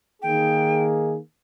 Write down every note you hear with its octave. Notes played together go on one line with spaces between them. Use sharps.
D#3 A#3 D#4 G#4 G5